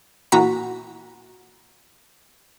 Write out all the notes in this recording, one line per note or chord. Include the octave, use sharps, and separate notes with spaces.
A#2 E3 F#4 A#5 B6